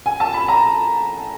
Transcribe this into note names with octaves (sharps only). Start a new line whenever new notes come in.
G#5
A5
B5
A#5